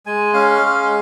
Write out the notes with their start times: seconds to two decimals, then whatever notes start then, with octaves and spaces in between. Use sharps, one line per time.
0.06 G#3 G#5
0.34 C#4 F5
0.61 G#3